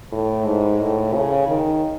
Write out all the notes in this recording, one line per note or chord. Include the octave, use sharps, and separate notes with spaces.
A2
G#2
A2
C#3
D#3